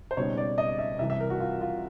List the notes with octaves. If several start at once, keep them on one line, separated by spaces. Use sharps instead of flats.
C5
C#2 B2 G3 C4 D#4 C#5
D5
D#5
E5
C2 C3 E3 G3 E5
E5
A#4
F#4
F4
F4